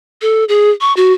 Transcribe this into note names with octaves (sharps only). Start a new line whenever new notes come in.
A4
G#4
C#6
F#4